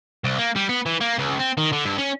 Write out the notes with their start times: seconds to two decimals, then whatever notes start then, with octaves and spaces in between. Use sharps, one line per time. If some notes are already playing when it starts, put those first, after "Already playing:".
0.24 C2
0.38 A#3
0.56 G3
0.69 B3
0.86 E3
1.01 A#3
1.18 C#2
1.39 C4
1.58 D#3
1.73 D3
1.85 G2
1.98 C#4